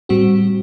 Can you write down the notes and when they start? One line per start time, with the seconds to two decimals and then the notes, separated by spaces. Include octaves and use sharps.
0.09 A2 G3 C4 F#4